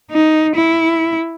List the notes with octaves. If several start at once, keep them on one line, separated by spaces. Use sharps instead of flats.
D#4
E4